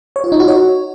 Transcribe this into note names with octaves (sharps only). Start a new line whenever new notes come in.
C#5
F4
D#4
F#4
C#5